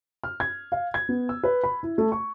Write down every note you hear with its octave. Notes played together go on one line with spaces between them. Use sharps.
F6
G#6
F5
G#6
B3
E6
B4
B5
E4
A3
C#6